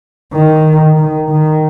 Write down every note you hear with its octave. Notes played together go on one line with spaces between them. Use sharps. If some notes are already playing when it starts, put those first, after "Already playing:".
D#3
D#3
D#3